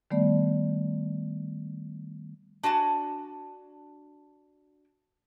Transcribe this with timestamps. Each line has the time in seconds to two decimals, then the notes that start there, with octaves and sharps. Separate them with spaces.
0.11 D#3 G3 A3 B3 D5
2.63 D4 F#4 G#5 A5